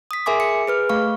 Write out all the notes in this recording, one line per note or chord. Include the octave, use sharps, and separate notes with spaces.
D#6 B6
G#4 A#4 E5 G#5 C6 D6
C#7
G#4 B4 F6
A3 F5 C#6